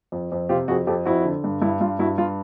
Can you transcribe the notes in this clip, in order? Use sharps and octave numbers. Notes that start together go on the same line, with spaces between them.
F2
F2
C3 F4 G4
F2 F#4 G#4
F2 G4 A4
F2 E4 F#4
D3
G2
G2 E4
G2 F4
G2 E4 F#4
G2 F4